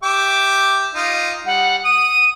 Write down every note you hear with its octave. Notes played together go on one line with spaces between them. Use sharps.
G4 E5 D6
D#4 F4
G3 F#5
D#6 D#7